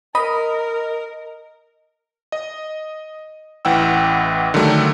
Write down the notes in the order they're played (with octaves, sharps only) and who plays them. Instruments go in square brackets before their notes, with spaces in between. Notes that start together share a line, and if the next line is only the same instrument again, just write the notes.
[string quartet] A#4 [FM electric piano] D#5 [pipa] B5
[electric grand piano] D#5
A1 E3 F#5 G5 E6
D3 D#3 F#3 G3 A3